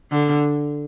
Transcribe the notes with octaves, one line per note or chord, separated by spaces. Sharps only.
D3